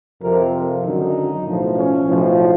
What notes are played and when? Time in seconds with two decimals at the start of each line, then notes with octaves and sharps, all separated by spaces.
0.21 F2 C3 F3 A#4
0.52 F4
0.83 G#1 F#2 D3 F#3 D#4
1.44 B1 A2 F3
1.75 C#4
2.06 B1 A2 F3